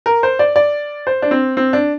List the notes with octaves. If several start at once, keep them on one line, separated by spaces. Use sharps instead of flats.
A#4
C5
D5
D5
C5
D4
C4
C4
D4